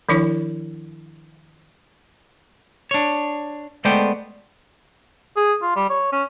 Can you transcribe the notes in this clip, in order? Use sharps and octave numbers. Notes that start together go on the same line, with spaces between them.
D#3 F3 D4 E4 C#5
D4 C#5
G#3 A3 B3 C5 D5 G5
G#4
F4
G3
C#5
C#4